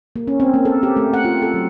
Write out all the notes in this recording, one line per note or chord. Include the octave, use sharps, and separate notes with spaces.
A#3
C#4
C4
A#3
A4
G4
A3
F#5
F4
A4
F#3